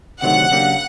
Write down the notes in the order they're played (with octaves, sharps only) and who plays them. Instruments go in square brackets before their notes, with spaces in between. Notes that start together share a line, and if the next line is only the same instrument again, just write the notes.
[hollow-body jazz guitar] D2 C3 D#3 F#3 A3 [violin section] F#5
[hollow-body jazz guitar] C#3 F#3 A#3 D4 G4